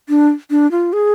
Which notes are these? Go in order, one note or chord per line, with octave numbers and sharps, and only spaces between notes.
D4
D4
F4
G#4